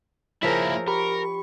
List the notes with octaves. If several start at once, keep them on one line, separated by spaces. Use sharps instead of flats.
F3 A#3 E4 G#4 A#4 C#5 E5
G4 A#4 B5 C#6